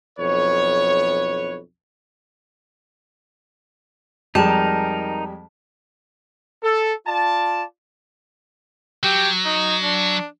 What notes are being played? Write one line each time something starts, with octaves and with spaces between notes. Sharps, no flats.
B1 F2 B4 C#5
F2 G3 G#3 D#4 A#4 A5
A4
F4 D5 A5
F#3 G4
D#4
D4